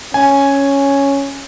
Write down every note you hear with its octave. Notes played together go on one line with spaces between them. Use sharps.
C#4 G#5